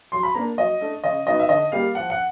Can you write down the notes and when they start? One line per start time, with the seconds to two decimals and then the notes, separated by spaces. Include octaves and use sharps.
0.12 F#3 C6
0.23 B5
0.35 A#3 D4 A#5
0.58 F#3 D#5
0.81 A3 D4
1.04 C#3 D#5
1.26 F#3 B3 D#4 D#5
1.39 E5
1.49 D3 D#5
1.72 G3 A#3 F5
1.95 F3 F#5
2.10 F#5